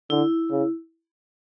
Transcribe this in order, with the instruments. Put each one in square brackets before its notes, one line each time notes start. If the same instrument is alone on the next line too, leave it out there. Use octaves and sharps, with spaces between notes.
[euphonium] D3 [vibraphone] E4
[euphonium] C#3